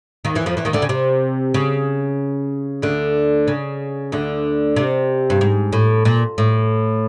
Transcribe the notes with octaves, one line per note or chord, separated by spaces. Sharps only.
D#2 D#3
E2 E3
F2 F3
E2 E3
D#2 D#3
D2 D3
C#3
C3
C#3
D2 D3
C#3
D2 D3
C3
G2
G#2
A2
A#2
A2